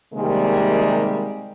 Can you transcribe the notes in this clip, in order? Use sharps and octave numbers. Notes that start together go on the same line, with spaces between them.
C3 D#3 G3 G#3 A#3